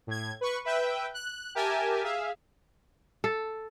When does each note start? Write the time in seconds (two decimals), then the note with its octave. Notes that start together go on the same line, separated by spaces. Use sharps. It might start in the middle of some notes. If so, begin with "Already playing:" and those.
0.07 A2 G#6
0.41 B4 C#6
0.65 B4 E5 G5
1.14 F#6
1.55 G4 A#4 E5 G#5 A5
2.03 G#4 E5 F5
3.24 A4